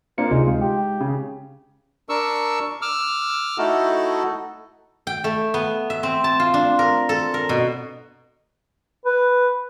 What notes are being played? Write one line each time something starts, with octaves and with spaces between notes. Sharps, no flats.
A#3 C4 D4 F4 C#7
D2 C3 G#3 D#4 F4
G#3 F4
G4
C#3
D4 A#4 C#6 E6
D6 E6 F6
A3 D#4 E4 F#4 A4
G5
A3
B3
E5
C4
A5
F4
D4
A#4
A4
A#4
B2
B4